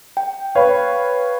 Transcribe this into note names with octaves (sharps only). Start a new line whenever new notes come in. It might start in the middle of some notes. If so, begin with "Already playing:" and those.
G5
B4 C#5 F5